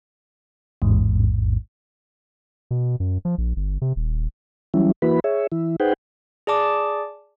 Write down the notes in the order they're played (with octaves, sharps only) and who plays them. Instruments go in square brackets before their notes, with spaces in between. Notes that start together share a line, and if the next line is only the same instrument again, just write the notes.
[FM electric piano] A1 E2 G#2
[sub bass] B2
F#2
F3
A#1
G1
C3
D#1
[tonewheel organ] E3 F#3 G3 C#4 E4
E3 A#3 E4 F#4 B4 B5
G#4 C#5 E5
E3 E4
D#4 G#4 B4 C5 F#5 G5
[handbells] G#4 D5 A5 D6